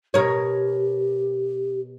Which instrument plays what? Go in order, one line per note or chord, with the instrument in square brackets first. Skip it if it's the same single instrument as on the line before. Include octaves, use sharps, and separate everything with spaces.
[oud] B2 A#4 C#5 [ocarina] G4